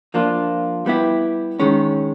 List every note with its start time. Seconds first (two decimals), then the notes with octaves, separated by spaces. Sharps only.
0.14 F3 A#3 D4 F4
0.86 G3 B3 E4 G4
1.60 D#3 G#3 C#4